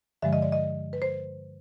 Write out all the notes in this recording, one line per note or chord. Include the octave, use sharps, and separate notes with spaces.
G2 D3 F3 G#3 E5
D#5
D5
D#5
B4
C5